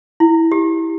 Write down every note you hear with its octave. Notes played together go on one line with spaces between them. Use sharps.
E4
G4